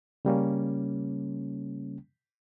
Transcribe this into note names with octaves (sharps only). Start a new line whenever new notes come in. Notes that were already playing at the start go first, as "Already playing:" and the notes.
C#3 G3 A#3 C#4